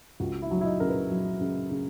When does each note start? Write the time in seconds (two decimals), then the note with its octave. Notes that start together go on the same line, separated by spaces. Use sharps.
0.20 C#2 F#4
0.42 E4
0.51 F#3
0.61 E4
0.65 D#4
0.80 C#3 A#4
0.88 B4
1.10 F#3
1.41 C#3
1.71 C#3